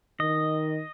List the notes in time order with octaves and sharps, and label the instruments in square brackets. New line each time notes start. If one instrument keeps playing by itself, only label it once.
[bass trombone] D#3 [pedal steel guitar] D#5